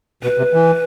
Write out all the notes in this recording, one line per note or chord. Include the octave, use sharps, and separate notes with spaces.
B2 B4
C3
E3